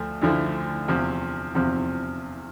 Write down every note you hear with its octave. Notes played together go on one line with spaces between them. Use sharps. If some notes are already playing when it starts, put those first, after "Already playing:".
Already playing: D2 F3 A3
D2 D3 F3 A3 E4
E2 C3 F3 C4
E2 C3 F3 C4